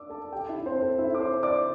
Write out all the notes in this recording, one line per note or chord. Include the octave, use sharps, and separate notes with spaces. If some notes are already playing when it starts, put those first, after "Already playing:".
Already playing: D5 F#5 D6 E6
A4 A5
G4 G5
E4 E5
C4 C5
A4
E4 E5
D6
C5 C6
D5 D6